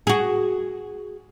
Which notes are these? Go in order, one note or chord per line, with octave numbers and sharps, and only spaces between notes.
F#4 G#4